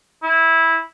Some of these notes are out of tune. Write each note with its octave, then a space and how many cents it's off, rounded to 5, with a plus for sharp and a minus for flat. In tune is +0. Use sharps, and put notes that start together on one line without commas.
E4 -10